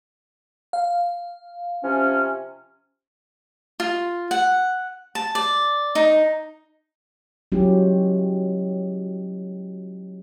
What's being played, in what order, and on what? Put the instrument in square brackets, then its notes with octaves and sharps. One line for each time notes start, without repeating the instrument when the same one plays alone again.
[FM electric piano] F5
[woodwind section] C3 F3 C#4
[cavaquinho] F4
F#5
A5
D5
D#4
[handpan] F#3 G#3 C#4 E4 F4 G4